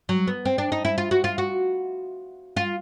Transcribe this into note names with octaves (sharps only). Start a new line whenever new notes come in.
F#3
B3
C4
D4
D#4
E4
F4
F#4
F4
F#4
F4